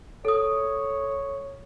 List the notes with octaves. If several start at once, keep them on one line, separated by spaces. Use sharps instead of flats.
A4 C#5 D#6